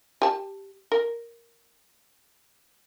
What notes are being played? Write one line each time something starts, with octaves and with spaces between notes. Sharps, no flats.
G4 A5
A#4